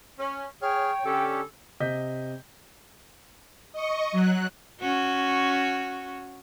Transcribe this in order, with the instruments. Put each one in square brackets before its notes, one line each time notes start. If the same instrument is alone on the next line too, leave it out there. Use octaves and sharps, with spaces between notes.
[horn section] C#4
[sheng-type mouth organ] G#4 F6 [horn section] C#5 [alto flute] G5
[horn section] D3 A4 [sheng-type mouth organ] C#4 G4 C#5
[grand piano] C3 D#5 G6 B6
[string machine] D#5 C#6
F#3 F#6
[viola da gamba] C#4 F#4